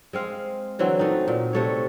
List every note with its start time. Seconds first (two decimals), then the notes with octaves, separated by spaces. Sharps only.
0.13 G#3 C4 F5
0.79 D3 E3 F#3 C4
0.99 A3 D#4
1.28 A#2
1.53 C3 A3 C#5